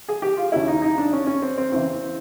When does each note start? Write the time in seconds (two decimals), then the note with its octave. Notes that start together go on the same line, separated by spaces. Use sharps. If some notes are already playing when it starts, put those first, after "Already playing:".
0.08 G#4
0.22 G4
0.37 F4
0.52 D#2 C#3 F#3 E4
0.67 D#4
0.82 D#4
0.98 D4
1.13 C#4
1.27 C#4
1.42 C4
1.58 C4
1.72 E2 C#3 E3 C4